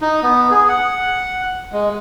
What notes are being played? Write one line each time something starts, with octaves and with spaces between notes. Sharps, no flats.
D#4
B3
G#4
F#5
G#3